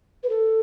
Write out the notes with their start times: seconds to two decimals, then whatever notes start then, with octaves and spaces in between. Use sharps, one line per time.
0.23 B4
0.29 A4